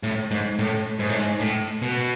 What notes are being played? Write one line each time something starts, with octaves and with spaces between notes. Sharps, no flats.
A2
G#2
A2
G#2
A2
G#2
A2
B2